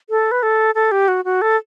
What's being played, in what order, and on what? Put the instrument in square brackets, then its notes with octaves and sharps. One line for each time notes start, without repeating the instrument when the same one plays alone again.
[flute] A4
B4
A4
A4
G4
F#4
F#4
A4